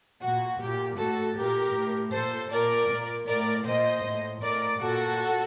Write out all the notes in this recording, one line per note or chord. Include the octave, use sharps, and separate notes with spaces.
A#2 F#4
A#2 G4
A2 F#4 A4
A#2 G4 A#4
A2
A#2 A4 C5
A#2 A#4 D5
A#2
A2 A#4 D5
A#2 C5 D#5
A2
A2 A#4 D5
A#2 F#4 A4